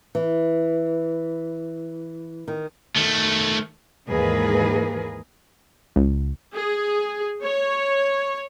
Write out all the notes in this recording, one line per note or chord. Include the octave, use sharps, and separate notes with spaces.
E3
D#3
D#3 A3
D#2 G#2 E3 G#4 A#4 B4
C#2
G#4
C#5